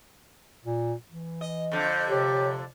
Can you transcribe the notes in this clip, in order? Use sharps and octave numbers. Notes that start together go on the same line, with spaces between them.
A#2
E3
D#5
F2 D3 G6
C3 G4 C#5